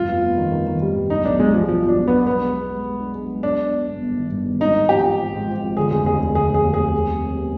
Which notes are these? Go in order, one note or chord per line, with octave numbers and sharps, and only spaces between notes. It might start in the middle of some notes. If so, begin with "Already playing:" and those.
Already playing: F1 G2 F4
B3
B3
D#3
D#3
D#3
G3
G2
B1 D#4
B1 D4
G3 G#3
B1 F3
B2 F3
B2 D4
B1
B2 B3
B1 B3
G#3
G#3
G#3
G#3
D4
G#3
G#3
B3 D4
B3
B3
G1
G1
D#3
G2
D#3
G#1 D#4
G#2
F3 G4
F3
F3
G#2
F3
G#1
D3 G#4
F1 G#4
D#2 G#4
D3
D3 G#4
F1 G#4
D#2
G#4
D#2
C3
G3
F2
B3